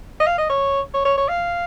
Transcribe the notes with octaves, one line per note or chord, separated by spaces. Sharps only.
D#5
F5
D#5
C#5
C#5
C#5
C#5
F5